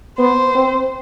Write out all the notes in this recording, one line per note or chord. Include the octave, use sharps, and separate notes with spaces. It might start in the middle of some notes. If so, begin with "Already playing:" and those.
B3 C5
C4